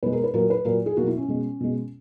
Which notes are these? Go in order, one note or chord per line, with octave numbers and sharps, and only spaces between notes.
B2 G#3 B4
A#4
B4
A#2 F#3 A#3 A#4
B4
A#2 F#3 A#3 A#4
G#4
B2 F#3 A#3 F#4
E4
C#4
B2 G#3
B2 G#3